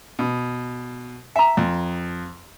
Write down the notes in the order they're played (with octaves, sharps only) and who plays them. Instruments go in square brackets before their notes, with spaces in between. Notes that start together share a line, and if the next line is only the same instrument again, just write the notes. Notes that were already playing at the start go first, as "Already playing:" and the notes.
[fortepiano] B2
[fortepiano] E5 [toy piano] G#5 A#5
[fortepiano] F2